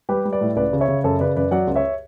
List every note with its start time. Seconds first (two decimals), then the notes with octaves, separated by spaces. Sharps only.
0.09 G3 G4 B4
0.25 G3
0.32 B4 D5
0.41 A2
0.56 C#2 B4 D5
0.73 C#3
0.81 C#5 E5
0.88 C#3
1.04 F#2 A4 C#5
1.20 C#3 B4 D5
1.36 F#2 B4 D5
1.51 F#3 D5 F#5
1.67 C#2
1.76 C#5 E5